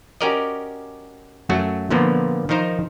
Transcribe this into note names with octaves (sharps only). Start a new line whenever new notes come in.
C#4 F#4 G4 A#4 D5 D#5
F#2 F#3 A3 F#4
A#2 D3 F3 A#3 B3
D#3 F3 D#4 A#4 C5